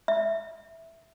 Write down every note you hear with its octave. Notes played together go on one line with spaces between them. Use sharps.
E5